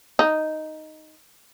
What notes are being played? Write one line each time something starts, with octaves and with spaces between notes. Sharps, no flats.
D#4